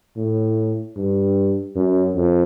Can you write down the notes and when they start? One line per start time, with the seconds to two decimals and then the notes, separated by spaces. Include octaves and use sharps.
0.17 A2
0.96 G2
1.76 F#2
2.15 F2